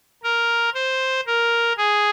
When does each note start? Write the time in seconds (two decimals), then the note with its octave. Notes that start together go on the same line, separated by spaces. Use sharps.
0.23 A#4
0.74 C5
1.27 A#4
1.78 G#4